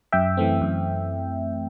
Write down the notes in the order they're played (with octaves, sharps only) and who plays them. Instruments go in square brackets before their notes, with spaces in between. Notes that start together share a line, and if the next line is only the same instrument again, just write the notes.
[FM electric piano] F#2 E5 G5
E3 A3 C4
F#2